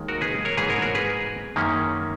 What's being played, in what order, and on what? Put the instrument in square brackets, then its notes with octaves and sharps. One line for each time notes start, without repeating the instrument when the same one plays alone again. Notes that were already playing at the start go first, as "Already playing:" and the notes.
Already playing: [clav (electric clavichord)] D#2 D#3 G#3
F#4 A#4
G#4 B4
A#4 C#5
G#2 E3 A#3 G#4 B4
A#4 C#5
F#4 A#4
G#4 B4
F#2 D#3 A#3 C#4